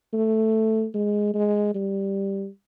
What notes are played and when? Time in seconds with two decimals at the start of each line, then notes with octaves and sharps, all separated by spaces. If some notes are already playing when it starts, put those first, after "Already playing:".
0.13 A3
0.94 G#3
1.34 G#3
1.75 G3